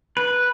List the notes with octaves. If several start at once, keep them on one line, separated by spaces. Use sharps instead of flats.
B4